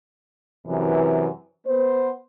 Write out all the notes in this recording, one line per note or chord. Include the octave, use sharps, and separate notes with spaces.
F#2 C3 E3
B3 C5